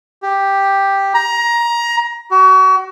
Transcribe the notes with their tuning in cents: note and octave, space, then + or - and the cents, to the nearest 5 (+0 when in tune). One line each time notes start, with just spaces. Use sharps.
G4 +5
A#5 +20
F#4 +35